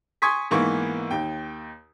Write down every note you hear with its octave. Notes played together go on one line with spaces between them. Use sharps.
G#5 C6 C#6 D#6 G#6 B6
G#2 E3 A#3 B3 C#6
D#2 G5